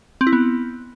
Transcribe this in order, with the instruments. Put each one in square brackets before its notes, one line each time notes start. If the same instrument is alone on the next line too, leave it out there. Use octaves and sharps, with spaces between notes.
[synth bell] C4
E4
B3